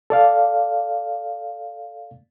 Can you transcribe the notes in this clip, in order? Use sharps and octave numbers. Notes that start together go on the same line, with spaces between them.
A4 D5 F5